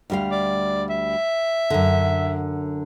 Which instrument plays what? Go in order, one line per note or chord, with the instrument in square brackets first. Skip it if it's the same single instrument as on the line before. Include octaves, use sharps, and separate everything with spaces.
[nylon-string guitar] D2 G3 F5
[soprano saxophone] D5
E5
[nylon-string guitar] F#2 D3